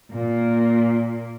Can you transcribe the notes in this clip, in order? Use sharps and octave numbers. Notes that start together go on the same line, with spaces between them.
A#2 A#3